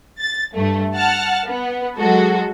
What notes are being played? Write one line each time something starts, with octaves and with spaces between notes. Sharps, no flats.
A6
G2 A3
F#5 A5 F6
B3
F#3 G#3 F#4 A4